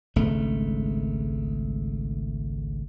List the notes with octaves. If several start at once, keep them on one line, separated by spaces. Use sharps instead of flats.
G#1 C#2 A3